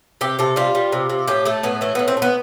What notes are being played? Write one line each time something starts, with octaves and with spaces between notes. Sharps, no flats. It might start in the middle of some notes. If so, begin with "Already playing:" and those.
C3 G4
C3 A4
G3 F4
G3
C3
C3
A2 G4
A3 A4
A2 B3
E3 A3
A2 B3
C4
A3
B3